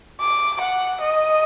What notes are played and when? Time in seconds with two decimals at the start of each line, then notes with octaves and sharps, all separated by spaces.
0.21 D6
0.61 F#5
1.02 D#5